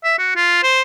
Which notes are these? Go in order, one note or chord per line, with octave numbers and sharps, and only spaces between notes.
E5
F#4
F4
C5